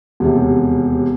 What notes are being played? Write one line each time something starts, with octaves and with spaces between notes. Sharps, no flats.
E1 D#2 C3